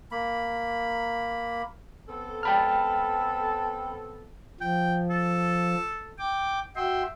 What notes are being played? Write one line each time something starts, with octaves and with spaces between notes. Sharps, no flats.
A#3 B5
B3 C4 A4
G5 A5 B5 F6
F3 G5
A4
G5 D6
F#4 E5 G5 C6